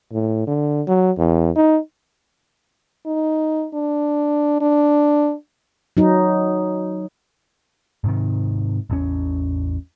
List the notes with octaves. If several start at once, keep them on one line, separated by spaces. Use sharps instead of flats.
A2
D3
F#3
E2
D#4
D#4
D4
D4
F#3 D#4
G#2 C3 D#3
A1 E2 C#4